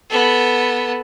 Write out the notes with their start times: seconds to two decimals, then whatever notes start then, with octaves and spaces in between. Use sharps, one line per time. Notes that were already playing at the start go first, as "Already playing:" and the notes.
0.10 B3 A4